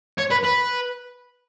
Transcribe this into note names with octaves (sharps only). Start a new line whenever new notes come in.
C#5
B4
B4